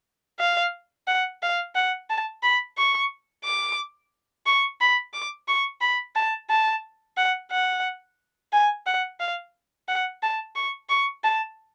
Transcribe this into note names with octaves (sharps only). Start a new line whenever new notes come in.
F5
F#5
F5
F#5
A5
B5
C#6
D6
C#6
B5
D6
C#6
B5
A5
A5
F#5
F#5
G#5
F#5
F5
F#5
A5
C#6
C#6
A5